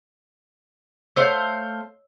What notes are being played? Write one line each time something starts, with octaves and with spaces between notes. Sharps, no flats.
A3 C5 C#5 D#5 F5 E6